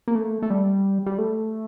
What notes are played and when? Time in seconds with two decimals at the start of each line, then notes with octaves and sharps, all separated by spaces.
0.08 A#3
0.15 A3
0.42 A3
0.50 G3
1.06 G3
1.18 A3